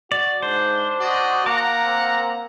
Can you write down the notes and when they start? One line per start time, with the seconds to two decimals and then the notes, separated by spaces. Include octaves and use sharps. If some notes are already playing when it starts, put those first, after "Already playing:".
0.12 F#4 D5
0.42 G#2 D4 C5
1.00 F#4 D5 D#5
1.46 A#3 F#5 A#5 D6
1.84 C4